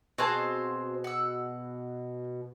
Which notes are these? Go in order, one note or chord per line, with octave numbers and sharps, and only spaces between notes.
B2 C4 F4 F#4 G#4 C5 A5
F#5 E6